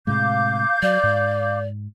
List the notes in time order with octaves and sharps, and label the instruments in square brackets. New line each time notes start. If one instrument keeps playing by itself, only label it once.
[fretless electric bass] A2 C3 G#3 [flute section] F5 D6 G6
[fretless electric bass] F#3 [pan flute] D5
[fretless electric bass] G#2